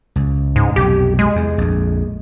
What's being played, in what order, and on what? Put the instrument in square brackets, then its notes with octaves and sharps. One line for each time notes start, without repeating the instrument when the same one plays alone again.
[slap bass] C#2
[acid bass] G#2
[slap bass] B1 F2 C3 [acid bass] G4
[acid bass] G#3
[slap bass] E2
A#1 F2